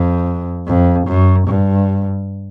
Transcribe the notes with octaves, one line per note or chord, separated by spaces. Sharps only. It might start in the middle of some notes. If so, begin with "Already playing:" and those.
Already playing: F2
F2
F#2
G2